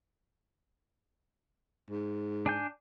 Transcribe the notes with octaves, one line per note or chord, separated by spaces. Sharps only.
G#2
D4 G#5 G6